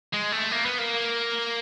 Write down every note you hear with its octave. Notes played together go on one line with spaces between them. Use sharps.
G#3
A3
A#3
B3
A#3